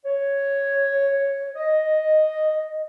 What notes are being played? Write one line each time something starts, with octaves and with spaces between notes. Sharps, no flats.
C#5
D#5